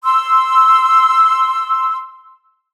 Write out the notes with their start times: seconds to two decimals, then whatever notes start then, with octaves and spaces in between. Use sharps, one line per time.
0.03 C6 E6